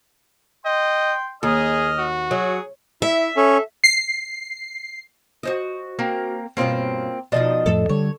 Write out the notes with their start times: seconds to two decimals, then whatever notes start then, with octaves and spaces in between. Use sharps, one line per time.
0.65 D#5 G5 C6
1.43 D#2 G#4 D#5 F6
1.98 F#4
2.31 F#3 G#4
3.02 E4 E5
3.37 C#4 A4
3.84 C7
5.43 F#4 C5 D#5
5.99 A#3 C4 A#4
6.57 G2 B2 A#3 C4 C#4 F4
7.32 B2 F3 D4 D#4 D#5
7.66 F2 A2 F3 A4
7.89 D3 G3 C#5